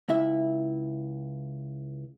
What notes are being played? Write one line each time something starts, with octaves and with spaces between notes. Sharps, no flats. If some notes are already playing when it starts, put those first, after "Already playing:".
C#2 E4 E5